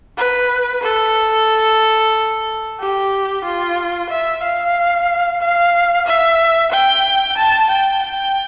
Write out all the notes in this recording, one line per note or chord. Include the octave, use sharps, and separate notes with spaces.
B4
A4
G4
F4
E5
F5
F5
E5
G5
A5
G5
G5